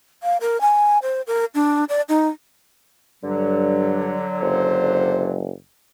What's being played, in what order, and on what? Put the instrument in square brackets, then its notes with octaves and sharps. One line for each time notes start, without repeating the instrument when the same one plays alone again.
[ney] F5
A#4
G#5
C5
A#4
D4
D5
D#4
[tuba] G2 [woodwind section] D3 F#3
[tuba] F#1 [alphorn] C5